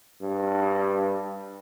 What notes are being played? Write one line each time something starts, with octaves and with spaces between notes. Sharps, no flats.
G2